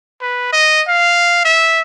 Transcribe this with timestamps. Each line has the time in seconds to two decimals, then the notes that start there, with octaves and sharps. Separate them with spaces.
0.22 B4
0.53 D#5
0.88 F5
1.45 E5